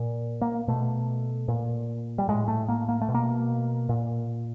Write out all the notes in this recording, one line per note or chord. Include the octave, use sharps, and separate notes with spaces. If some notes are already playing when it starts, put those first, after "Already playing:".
Already playing: A#2
A#3
B2 A3
A#2
G3
A2 G#3
A3
A#3
A#3
A3
B2
A#3
A#2